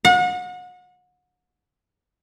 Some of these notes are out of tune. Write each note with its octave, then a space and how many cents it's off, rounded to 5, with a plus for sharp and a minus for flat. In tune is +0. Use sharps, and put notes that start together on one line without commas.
F#5 -35